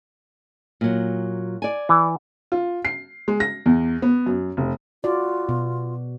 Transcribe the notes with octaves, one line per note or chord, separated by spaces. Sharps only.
A#2 F#3
D5 G#5
E3
F4
C7
G#3
A#6
E2
B3
F#2
F1
F4 F#4 D5
B2